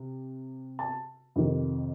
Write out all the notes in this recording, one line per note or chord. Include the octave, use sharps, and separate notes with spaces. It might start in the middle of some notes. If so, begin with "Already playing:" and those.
Already playing: C3
A5
F2 C3 D#3